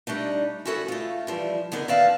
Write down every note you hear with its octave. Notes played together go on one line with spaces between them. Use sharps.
G3 A3 D4 D#4
C#4 E4 F#4 G#4 A4 C#5
A3 F4
E3 F3 G3
D3 B3 D#4 G#4 A#4
D#3 B3 D5 E5 F5 A5